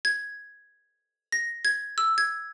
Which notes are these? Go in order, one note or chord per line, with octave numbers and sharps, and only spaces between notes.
G#6
A#6
G#6
E6
G#6